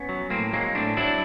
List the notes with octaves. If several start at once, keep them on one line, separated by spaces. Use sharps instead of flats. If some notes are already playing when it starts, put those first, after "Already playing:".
Already playing: B3 C#4
F#3
A2 A#3 C4
F#3 G#3 A#3
A2 C4 D4
F#3 D4 E4